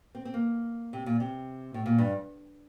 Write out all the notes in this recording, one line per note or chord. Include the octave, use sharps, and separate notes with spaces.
C4
C4
A#3
C3
A#2
C3
A2
A#2
G2